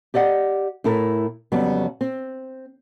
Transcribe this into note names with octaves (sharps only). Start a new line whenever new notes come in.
G4 D5 D#5 F#5
A2 E4 A4 A#4
F2 C#3 F#3 G3 B3
C4